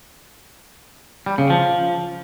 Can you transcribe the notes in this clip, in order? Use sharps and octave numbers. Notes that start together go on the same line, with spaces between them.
G3
C#3
F3